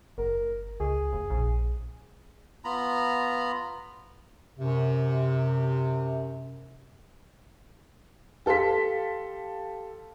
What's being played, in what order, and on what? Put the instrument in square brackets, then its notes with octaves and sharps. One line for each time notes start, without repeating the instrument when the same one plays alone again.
[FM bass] F#1 [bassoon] A#4
[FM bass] C#2 [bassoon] G#4
[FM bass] F1
A#1
[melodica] B3 F4 A#5 B5
[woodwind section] F#2 C3
[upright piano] G4 A4 F5 C6 B6